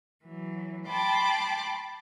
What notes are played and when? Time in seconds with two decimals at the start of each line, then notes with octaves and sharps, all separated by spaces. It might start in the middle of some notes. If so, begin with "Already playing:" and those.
0.23 E3 F#3
0.88 G5 A5 B5 C6 D6